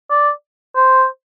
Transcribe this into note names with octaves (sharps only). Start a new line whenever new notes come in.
D5
C5